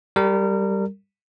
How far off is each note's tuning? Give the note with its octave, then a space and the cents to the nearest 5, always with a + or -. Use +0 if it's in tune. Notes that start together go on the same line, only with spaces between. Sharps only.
G3 +0 A#4 -30